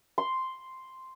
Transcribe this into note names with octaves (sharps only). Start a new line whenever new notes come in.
C6